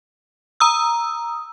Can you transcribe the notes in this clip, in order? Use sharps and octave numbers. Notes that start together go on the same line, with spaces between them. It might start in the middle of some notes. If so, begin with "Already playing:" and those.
A#5 D#6 E6